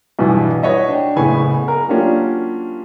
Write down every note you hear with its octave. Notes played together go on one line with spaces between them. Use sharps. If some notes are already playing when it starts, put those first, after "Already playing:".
B1 E2 G2 B2 B3 E4
E4 F#4 B4 C#5 D#5 E5
D4 G5
F#1 A2 B3 G#5 B5 C#6
A#4
F#3 A#3 C#4 D4 F4 G4